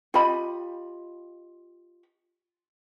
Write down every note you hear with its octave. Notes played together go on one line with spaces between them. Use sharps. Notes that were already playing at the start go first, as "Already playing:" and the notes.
F4 G4 D#5 B5